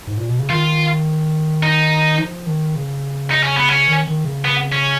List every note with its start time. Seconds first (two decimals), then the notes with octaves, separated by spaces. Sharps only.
0.07 G#2
0.17 A#2
0.28 B2
0.39 C#3
0.49 D#3 F4
1.63 D#4
2.19 F3
2.46 D#3
2.75 C#3
3.31 D#4
3.43 C#4
3.57 B3
3.69 C#4
3.87 D#3
4.07 D#3
4.25 C#3
4.45 B3
4.72 C#4